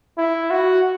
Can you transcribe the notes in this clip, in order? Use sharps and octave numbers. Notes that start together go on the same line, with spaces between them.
E4
F#4